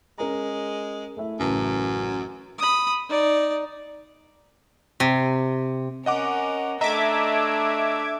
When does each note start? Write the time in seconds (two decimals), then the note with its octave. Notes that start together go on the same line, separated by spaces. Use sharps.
0.18 G#3 C#4 A#4 A#5
1.17 A3 E4 E5
1.40 A1 F#2 C#3 A5
2.58 B5 D#6
3.10 D#4 D5
5.00 C3
6.06 C#4 A#4 D#5 F#5 D6
6.81 A3 D4 D#5 E5 A#5 D6 G#6